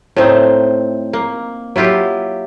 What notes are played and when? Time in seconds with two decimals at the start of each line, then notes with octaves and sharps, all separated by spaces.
0.16 A2 A3 C4 D#4
1.13 A#3
1.76 F#3 E4 F4 G4